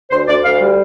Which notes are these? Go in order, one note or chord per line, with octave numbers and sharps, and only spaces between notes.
D2 C5
D2 D5
D2 F5
G3